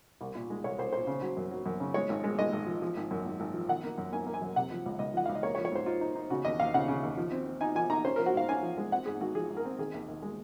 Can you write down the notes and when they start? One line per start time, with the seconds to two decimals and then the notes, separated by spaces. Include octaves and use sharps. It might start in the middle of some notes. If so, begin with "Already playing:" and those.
0.21 C2
0.35 A#2
0.50 G#3
0.64 C2 C#5
0.78 C2 C5
0.93 A#2 C5
1.07 C#3
1.22 F#3
1.37 F#2
1.51 F#3
1.66 F#2
1.80 C#3
1.94 G#3 C#5
2.09 G#1
2.24 G#3
2.39 G#3 D#5
2.52 G#1
2.67 F3
2.82 F3
2.97 G#1
3.11 F#2
3.26 G#1
3.40 G#1
3.54 F3
3.68 D#3 F#5
3.84 A#3
3.98 F#2
4.12 A#3 G#5
4.26 A#3
4.34 G#5
4.42 F#2
4.56 C3 F#5
4.71 F3
4.86 C#2
4.99 C#2 D#5
5.14 F3 F#5
5.26 C#2 F5
5.35 D#5
5.43 A#3 C#5
5.55 C#5
5.58 F3
5.65 C#5
5.72 G#2 C5
5.86 D#4 F4
6.01 D#4
6.15 D#4
6.30 C#3 F#4
6.45 D#2 D#5
6.59 D#2 F5
6.74 C#3 F#5
6.88 C#3
7.03 D#2
7.17 F3
7.32 C4
7.46 C4
7.61 D#4 G#5
7.75 F3 G#5
7.90 D#4 A#5
8.05 C#4 C5
8.16 F3 A#4
8.26 F#4
8.34 G#2 F5
8.48 C#4 G#5
8.63 F3
8.77 G#3
8.91 C4 F#5
9.06 G#2 G#4
9.20 G#1 F#4
9.35 F3 G#4
9.49 G#2
9.57 A#4
9.65 C4
9.78 D#3 G#4
9.94 D#2
10.08 D#2
10.22 G#3